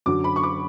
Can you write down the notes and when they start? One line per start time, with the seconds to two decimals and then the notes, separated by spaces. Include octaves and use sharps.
0.06 F#2 D3 F#3 D6
0.24 B5
0.36 C#6
0.43 D6